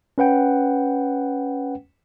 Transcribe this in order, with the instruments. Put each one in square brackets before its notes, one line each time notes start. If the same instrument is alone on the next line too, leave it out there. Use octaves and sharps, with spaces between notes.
[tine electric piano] C#4 B4 F#5 G5